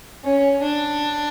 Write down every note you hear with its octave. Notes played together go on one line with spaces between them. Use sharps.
C#4
D4